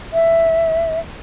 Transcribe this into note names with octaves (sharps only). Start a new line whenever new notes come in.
E5